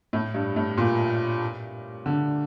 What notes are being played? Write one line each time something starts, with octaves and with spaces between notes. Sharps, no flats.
A2
G2
A2
A#2
D3